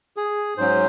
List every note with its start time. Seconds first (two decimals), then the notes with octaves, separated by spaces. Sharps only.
0.17 G#4
0.58 G#2 F#3 C#4 C5